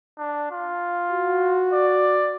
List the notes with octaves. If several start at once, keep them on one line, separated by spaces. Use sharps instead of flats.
D4
F4
F#4
D5